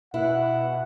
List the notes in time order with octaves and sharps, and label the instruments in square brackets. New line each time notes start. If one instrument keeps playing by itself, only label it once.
[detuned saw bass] B2 [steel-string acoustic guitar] E4 [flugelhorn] F#5